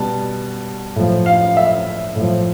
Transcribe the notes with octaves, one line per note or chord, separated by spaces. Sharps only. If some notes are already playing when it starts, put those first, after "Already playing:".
Already playing: B2 G3 A5
A2 F3
F5
E5
A2
F3